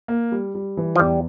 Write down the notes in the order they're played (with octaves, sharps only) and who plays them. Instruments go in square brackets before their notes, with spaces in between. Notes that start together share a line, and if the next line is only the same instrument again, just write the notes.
[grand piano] A#3
G3
G3
E3
[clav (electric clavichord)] F3
[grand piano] E2 [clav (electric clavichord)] G3